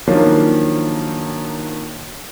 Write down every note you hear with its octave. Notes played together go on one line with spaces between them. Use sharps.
D#3 F3 F#3 A#3 C#4 D4